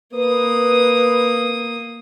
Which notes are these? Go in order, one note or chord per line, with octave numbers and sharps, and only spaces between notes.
A#3 B4 D#6